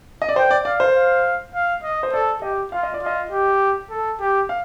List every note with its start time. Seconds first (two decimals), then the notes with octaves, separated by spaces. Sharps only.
0.22 D#5
0.29 D5
0.36 C5 G5
0.51 D5
0.65 D5 F5
0.80 C5
0.94 F5
1.55 F5
1.83 D#5
2.03 C5
2.13 A4 D5
2.42 G4 D#5
2.72 F4 F5
2.83 D#5
2.94 D5
3.02 F4 D#5
3.31 G4
3.90 A4
4.20 G4
4.49 F5